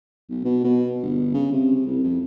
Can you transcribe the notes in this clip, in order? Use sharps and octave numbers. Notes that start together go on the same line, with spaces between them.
B1
B2
B2
G1
C#3
C3
C2
F2